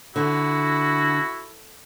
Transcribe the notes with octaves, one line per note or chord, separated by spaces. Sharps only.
D3 E4 F#4